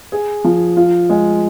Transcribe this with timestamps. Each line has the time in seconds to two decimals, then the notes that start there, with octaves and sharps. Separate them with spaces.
0.12 G#4
0.44 F3
0.77 F4
1.09 G#3